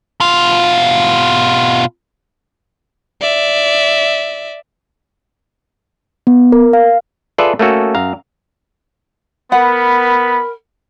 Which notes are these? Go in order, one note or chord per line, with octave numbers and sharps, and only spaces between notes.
B2 F4
D5 E5
B3
A#4
F5
F4 G#4 A4 B4 D5 E5
A3 A#3 C#4 F#4 A4
F#2 F5 A#5
B3 A#4 F#5 B5